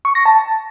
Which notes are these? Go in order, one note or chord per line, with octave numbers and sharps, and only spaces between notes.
C#6
A#6
A5